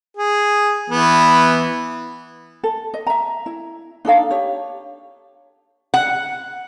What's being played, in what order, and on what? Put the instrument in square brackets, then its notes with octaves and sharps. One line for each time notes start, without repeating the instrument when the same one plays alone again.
[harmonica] G#4
E3 B3
[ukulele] A4
D#5
E5 A#5
E4
D4 D#4 A4 F5
G4 C#5
[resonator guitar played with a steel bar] F#5